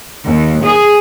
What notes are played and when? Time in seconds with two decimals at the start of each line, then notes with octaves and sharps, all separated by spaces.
0.23 D#2
0.65 G#4